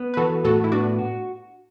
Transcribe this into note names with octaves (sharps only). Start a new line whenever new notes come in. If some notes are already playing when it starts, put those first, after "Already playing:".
Already playing: B3
B4
E3 F#4 A4
A2 F#4 A4
E4
B3 D4 F#4
F#4